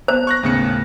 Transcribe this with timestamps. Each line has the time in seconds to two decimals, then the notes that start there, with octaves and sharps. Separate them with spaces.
0.08 B3 C5 A5 A#5
0.27 C#6 F#6 A#6
0.43 D#2 A2 C#3 B3 C#7